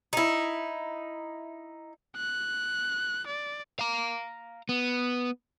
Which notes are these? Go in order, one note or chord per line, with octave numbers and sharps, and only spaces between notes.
D#4 E4
F#6
D5
F5 A#5
B3